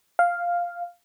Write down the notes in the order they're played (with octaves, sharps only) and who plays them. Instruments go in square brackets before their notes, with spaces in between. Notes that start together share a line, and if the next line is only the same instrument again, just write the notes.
[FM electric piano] F5